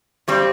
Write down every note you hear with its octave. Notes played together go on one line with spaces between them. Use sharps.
G2 G3 C4